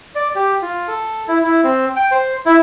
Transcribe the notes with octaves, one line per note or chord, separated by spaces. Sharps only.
D5
G4
F4
A4
E4
E4
C4
G5
C5
E4